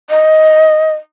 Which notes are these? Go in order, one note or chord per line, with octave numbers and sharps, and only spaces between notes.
D#5